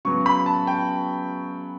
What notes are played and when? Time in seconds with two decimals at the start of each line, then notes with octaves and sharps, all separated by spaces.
0.05 C#3 F#3 B3 C#6
0.26 B5
0.46 A5
0.67 G5